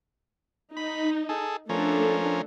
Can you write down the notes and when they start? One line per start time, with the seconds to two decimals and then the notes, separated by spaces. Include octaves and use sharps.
0.77 D#4 B5
1.29 G#4 A4
1.69 F3 A3 C#4 D4 A4 A#4